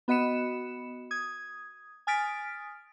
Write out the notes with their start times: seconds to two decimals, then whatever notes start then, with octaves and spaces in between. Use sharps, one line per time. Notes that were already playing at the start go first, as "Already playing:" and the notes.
0.08 B3 F#4 D#5 B5 C#7 E7
1.11 D#6 G#6
2.07 G#5 D#6 F6 A6 B6 D7